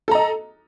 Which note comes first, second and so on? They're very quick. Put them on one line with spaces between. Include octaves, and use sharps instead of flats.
A4 A#5 D#5